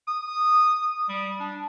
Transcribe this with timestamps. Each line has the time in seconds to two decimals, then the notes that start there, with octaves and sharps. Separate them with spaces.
0.07 D#6
1.09 G3
1.40 D4